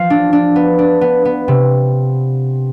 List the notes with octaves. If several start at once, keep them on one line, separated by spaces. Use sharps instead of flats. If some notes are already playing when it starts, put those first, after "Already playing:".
Already playing: F3 F5
D4
D4
B3
D4
B3
B3
C3